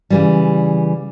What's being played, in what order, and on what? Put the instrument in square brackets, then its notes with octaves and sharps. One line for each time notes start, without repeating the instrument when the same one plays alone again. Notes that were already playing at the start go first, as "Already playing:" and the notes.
[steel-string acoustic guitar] C#3 E3 G3